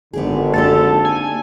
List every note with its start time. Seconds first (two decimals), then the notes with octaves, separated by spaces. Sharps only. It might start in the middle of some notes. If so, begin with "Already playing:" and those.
0.13 G#1 D3 B3 G4 G#4
0.53 A#3 D4 G4 A4
1.05 G#5